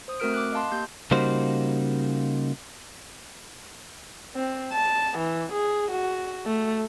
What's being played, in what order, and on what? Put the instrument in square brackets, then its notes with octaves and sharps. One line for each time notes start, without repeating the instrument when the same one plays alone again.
[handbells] C5 D#6
A3 C4 F#4 A#4 F6 D7
D6 F#6
D#5 F5 A5 C6
A#3 G4 G6
[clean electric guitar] C#3 G3 A#3 D#4 F#4 C5
[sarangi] C4
A5
E3
G#4
F#4
A3